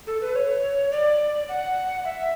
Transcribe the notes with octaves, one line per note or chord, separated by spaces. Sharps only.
A4
B4
C#5
D5
F#5
E5